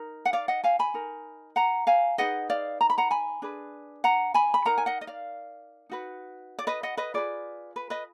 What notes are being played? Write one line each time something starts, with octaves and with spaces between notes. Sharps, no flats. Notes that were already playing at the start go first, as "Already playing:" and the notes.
Already playing: D#4 A#4
F#5
D5 F5
D#5 F#5
F5 G#5
G#5 B5
D#4 A#4
F#5 A#5
F5 G#5
D#4 G#4 B4 D#5 F#5
D5 F5
A#5
B5
F#5 A#5
G#5 B5
D4 G#4 B4
F#5 A#5
G#5 B5
B5
D#4 A#4 F#5 A#5
G#5
D#5 F#5
D#5
D5 F5
D#4 F#4 B4
D5
B4 D#5
D#5 F#5
B4 D#5
F4 G#4 B4 D5
B4
B4 D#5